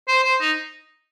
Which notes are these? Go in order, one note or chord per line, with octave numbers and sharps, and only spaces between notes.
C5
C5
D#4